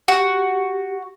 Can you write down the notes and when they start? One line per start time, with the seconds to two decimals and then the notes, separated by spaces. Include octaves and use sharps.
0.08 F#4 G4